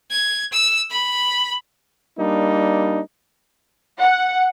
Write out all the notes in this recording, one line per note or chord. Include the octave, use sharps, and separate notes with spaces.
G#6
E6
B5
G3 A#3 D4 D#4
F#5